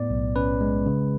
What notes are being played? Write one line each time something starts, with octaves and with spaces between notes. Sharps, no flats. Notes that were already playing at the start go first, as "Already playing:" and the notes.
Already playing: A2 B3 D5
B1
C#4 B4
G#3
C#3